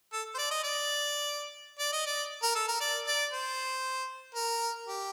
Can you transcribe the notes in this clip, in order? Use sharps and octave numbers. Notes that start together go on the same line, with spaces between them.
A4
C5
D5
D#5
D5
D5
D#5
D5
A#4
A4
A#4
D5
D5
C5
A#4
G4